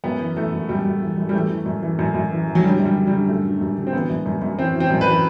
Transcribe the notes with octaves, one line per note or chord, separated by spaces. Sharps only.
F#2 B3
E3
E3 A3
F#2
F#2 G3
F#2
E3
F#2
G3
E3 A3
E3
F#2
E3
F#2
F#2
E3
E3
F#3
D3 G3
F#2
G3
D3
D3 G3
F#2 A3
D3
F#2
D3
C4
E3 B3
F#2
F#2
F#2
E3 C4
E3
C4
F#2
B4
E3